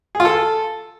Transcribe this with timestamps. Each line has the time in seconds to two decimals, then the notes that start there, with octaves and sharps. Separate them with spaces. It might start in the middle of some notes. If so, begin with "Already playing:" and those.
0.15 G#4
0.20 F4
0.25 A4